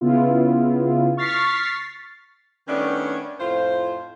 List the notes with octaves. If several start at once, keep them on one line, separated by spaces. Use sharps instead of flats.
C#3 B3 E4 F4
C#6 F6 A6 B6 C7
D#3 G3 A3 B3 C#4 D4
F2 A2 F4 C5